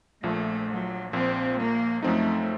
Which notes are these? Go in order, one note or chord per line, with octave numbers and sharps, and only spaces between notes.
A#1 A#2 F3 A3
F#3
A#1 A#2 F3 C4
A#3
F#2 F3 A3 C4 D#4